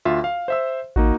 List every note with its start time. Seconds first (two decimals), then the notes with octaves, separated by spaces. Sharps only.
0.05 D2 F4 E5
0.24 F5
0.48 C5 E5 E6
0.96 A1 A#3 D#4 F#4